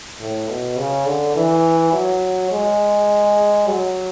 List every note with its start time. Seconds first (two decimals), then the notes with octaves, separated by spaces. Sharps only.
0.20 A2
0.49 B2
0.78 C#3
1.07 D3
1.36 E3
1.93 F#3
2.51 G#3
3.68 F#3